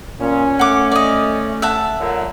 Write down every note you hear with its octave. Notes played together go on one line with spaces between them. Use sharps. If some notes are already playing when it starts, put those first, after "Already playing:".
A#2 C#4
A3 F#5 D6
D5 D#5
E5 F#5 A5
A#2 D3 F#3